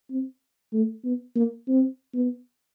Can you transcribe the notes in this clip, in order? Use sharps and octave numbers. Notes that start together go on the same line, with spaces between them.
C4
A3
B3
A#3
C4
B3